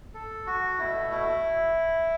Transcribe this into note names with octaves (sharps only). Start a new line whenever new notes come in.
A4
F#4
B2 A3 E4
E4